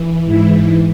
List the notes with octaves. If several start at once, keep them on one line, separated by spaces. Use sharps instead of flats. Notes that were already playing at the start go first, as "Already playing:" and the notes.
Already playing: E3
G#2 E3 E4